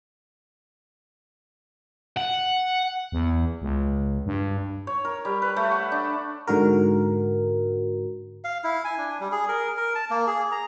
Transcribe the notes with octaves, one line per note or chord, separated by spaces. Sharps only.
F#5
E2
C#2
G2
C#5
A#4
G3
B4
A3
F#5
D4
G#2 D3 F#4 A#4
F5
E4
G#5
D4
G3
G#4
A#4
A#4
A5
A#3
G#4
A#5